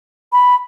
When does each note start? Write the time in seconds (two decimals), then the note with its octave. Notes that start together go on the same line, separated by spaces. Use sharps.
0.32 B5